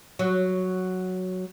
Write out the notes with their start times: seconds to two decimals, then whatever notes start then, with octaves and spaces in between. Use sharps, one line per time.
0.19 F#3